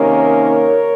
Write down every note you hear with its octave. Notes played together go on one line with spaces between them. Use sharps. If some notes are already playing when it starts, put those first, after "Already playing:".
Already playing: C3 D#3 A#3 C#4 A#4 C#5